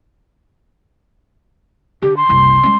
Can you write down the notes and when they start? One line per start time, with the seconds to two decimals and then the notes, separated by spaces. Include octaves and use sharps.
2.02 D3 G4
2.17 C6
2.29 F#1 C2
2.63 G#3 C#4